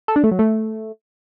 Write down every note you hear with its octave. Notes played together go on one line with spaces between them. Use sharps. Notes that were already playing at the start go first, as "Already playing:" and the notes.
A4
D4
A3
F#3
A3